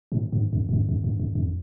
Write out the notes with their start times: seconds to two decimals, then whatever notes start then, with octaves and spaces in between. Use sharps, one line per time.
0.12 A2
0.32 G2
0.53 F2
0.69 F#2
0.73 F2
0.89 F2
1.04 F#2
1.19 F2
1.35 F2